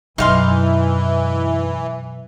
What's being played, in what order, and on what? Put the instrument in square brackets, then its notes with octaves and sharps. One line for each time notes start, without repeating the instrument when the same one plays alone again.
[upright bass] F#2 [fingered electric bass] B2 F#3 [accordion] E3 [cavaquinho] D#4 F5 C6